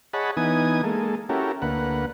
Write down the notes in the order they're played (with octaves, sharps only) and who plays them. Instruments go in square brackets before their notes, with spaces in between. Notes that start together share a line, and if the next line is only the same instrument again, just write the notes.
[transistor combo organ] G#4 C#5 D#5 F#5 A5 B5
E3 B3 D#4 G#5 D#6
G#3 A#3 A4
C#4 E4 F#4 G4 A4 A#4
D2 A#3 B4 F#5